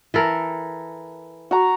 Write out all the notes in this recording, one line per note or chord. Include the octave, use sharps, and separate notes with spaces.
E3 A4 A#4
F#4 A#5